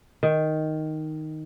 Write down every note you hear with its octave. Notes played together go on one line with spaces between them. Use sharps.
D#3